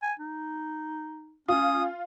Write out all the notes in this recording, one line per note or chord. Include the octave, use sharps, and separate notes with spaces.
G#5
D#4
C#4 F4 D#6